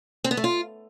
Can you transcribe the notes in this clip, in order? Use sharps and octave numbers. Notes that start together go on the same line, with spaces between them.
C4
B3
A3
F4